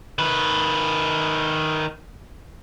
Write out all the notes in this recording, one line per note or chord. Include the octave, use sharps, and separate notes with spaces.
D#3 B4